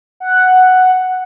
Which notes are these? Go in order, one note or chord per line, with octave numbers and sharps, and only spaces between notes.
F#5